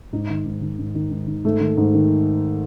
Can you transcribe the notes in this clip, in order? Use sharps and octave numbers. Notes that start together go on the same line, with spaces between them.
G#2 D#4
D#3
G#2
D#3
G#2
D#3
G#2
D#3
G#2 A3
D#3
G#2
D#3